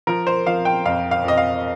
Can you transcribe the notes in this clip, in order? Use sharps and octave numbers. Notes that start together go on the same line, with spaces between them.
F3 A#4
C5
F3 F5
G5
F2 F5
F5
F2 D#5
F5